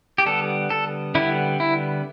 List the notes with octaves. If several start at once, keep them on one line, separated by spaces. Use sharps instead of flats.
G4
D3 G3 B3 A4
A4
D3 G3 B3 E4
E4